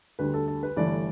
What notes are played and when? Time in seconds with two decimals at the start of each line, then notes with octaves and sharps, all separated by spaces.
0.19 D2 D3 G3 B4
0.34 A4
0.48 A4
0.63 B4
0.76 G1 G2 E3 A3 D5